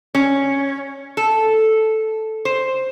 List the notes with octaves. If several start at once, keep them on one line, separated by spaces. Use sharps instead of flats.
C#4
A4
C5